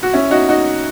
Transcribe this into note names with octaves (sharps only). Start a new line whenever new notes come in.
F#4
C#4 E4
D#4 F#4
D#4 F#4